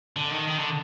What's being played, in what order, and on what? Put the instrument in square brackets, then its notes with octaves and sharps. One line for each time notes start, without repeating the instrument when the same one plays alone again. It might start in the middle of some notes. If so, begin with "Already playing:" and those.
[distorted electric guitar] D3
D#3
D#3
D3